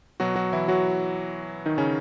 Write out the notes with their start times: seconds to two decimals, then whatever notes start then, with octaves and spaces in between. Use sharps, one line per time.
0.20 B2 F#3 F#4
0.35 F#3 F#4
0.53 E3 E4
0.68 F#3 F#4
1.66 D#3 D#4
1.78 C#3 C#4